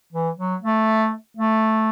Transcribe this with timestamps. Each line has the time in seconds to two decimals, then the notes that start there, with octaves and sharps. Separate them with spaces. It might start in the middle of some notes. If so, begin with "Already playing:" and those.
0.13 E3
0.38 F#3
0.62 A3
1.37 A3